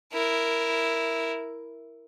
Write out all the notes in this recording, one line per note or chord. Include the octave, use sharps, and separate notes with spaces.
E4 A#4